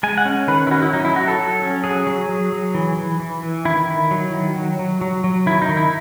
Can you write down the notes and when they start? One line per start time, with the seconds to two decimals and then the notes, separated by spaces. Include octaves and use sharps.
0.03 G#3 G#5
0.18 F#5
0.25 C#4
0.48 D#3 B4
0.67 E4
0.71 C#4 F#4
0.82 E4
0.93 F#3 D#4
1.05 E4
1.16 F#3 F#4
1.28 A4
1.39 F#3
1.62 C#4
1.84 F#3 G#4
2.07 F#3
2.29 F#3
2.52 F#3
2.75 E3
2.97 E3
3.20 E3
3.43 E3
3.65 D#3 E4
3.88 D#3
4.11 F#3
4.33 D#3
4.56 F#3
4.79 F#3
5.01 F#3
5.24 F#3
5.46 D#3 E4
5.62 D#4
5.69 D#3
5.77 E4